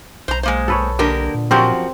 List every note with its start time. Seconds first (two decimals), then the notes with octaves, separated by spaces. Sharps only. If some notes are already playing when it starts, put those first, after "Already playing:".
0.28 B1 C5 A#5
0.43 G#3 A#3 C5
0.68 A4 B4 C#5
0.99 D3 A#3 G4 A#4 D#5
1.34 A#2
1.51 F#2 F3 C4 F#4 G4 A#4